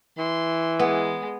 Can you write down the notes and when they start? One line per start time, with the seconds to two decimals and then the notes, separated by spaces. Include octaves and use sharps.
0.18 E3 C6
0.79 G#3 B3